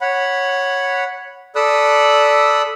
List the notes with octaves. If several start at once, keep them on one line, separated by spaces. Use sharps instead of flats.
C#5 F#5 B5
A4 D5 B5 D#6 E6 F#6